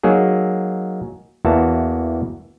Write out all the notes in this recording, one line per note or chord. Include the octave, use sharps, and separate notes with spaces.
F#3 A#3 D#4 G#4
E2 E3 A#3 F#4 A5